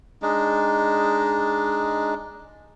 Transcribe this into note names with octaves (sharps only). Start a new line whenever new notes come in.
G#3 D4 D#4